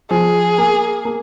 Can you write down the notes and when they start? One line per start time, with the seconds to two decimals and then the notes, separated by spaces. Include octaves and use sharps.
0.10 F3 G#4
0.58 A#3
1.05 A#3